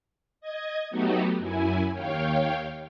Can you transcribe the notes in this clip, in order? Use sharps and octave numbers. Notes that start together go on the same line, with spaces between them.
D#5 G#6
F#3 A3 B3 D#4 F#4 G4
F#2 E4 G#5
D#2 C#5 F5 G5